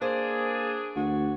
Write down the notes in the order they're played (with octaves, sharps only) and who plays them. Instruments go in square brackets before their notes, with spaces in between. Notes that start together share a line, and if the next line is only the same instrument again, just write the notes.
[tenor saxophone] A#3 [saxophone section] D4 G#4 [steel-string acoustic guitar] C5
[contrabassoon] D2 [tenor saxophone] F#4